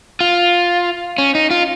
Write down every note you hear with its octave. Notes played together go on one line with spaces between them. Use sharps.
F4
C#4
D#4
F4